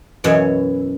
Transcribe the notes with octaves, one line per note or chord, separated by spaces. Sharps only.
F#2 B2 E3 C#5